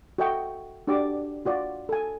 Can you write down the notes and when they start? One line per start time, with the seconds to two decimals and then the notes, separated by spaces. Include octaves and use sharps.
0.18 F#4 A4 D#5 E5 G5 C#6
0.87 D4 F#4 G4 D5 D6
1.45 F4 F#4 D5
1.89 A4 G#5